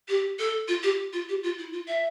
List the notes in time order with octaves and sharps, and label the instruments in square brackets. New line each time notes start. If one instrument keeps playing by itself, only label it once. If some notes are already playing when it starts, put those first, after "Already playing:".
[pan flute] G4
A4
F4
G4
F4
G4
F4
E4
F4
E5